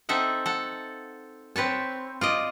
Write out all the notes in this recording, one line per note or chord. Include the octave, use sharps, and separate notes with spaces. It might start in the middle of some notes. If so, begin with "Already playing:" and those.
C4 D#4 A4 E5 F#5
A4 F#5
C4 B4 C#5 A5
F4 D5 D#5